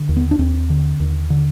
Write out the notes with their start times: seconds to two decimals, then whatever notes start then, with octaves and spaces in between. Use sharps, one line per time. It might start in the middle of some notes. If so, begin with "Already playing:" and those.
Already playing: D3
0.09 D#2
0.17 B3
0.31 D4
0.39 D#2 C4
0.70 D3
1.00 D#2
1.30 D3